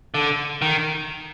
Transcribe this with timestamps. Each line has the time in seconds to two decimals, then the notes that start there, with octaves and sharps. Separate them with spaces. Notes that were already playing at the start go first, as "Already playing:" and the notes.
0.14 D3
0.62 D#3